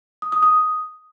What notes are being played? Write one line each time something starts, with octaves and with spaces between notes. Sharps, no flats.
D#6
D#6
D#6